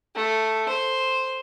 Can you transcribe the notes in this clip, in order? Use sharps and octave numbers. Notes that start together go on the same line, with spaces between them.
A3
C5